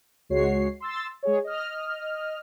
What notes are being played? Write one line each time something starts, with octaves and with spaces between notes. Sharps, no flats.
C#2 G#3 F#4 C#5 C7
C6 E6 A6
G#3 G#4 C#5
D#5 F6